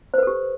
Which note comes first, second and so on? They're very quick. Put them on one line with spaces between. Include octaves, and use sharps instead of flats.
C5 B4 A4 G4